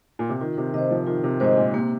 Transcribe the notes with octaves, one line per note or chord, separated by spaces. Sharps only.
A#2
C3
D#3 F4
C3
C3 C5 D#5
F3
D#3 F4
C3
G#2 C5 D#5
A#2
C3 A#3